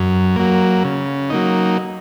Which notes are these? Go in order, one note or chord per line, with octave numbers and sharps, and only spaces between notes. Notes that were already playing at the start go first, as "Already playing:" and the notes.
Already playing: F#2
F#3 A#3
C#3
F#3 A#3 D#4